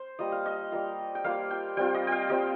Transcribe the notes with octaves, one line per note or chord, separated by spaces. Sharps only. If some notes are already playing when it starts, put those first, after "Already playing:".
Already playing: C5
G3 A#3 F4 D#5
F5
D#5
G3 A#3 F4
G5
G3 A#3 F4 F5
G5
G3 C4 F4 G5
D#5
G5
F5
G3 C4 F4 D#5